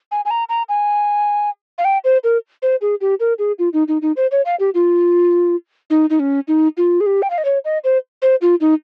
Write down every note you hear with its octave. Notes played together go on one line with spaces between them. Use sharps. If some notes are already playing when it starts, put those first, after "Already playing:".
G#5
G#5
A#5
A#5
G#5
F5
G5
C5
A#4
C5
G#4
G4
A#4
G#4
F4
D#4
D#4
D#4
C5
C#5
F5
G4
F4
D#4
D#4
C#4
D#4
F4
G#4
G4
G5
F5
D#5
C#5
D#5
C5
C5
F4
D#4